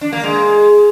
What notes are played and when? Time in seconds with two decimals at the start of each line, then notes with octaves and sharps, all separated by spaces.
0.01 D4
0.13 A#3
0.24 G#3